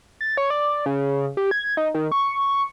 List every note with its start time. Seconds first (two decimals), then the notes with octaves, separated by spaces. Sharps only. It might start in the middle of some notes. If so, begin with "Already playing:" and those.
0.21 A6
0.37 C#5
0.50 D5
0.86 C#3
1.37 G4
1.51 G#6
1.77 D#4
1.95 D#3
2.12 C#6